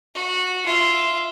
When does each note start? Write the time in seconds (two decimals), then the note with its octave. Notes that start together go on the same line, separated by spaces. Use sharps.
0.15 F#4
0.66 F4 E5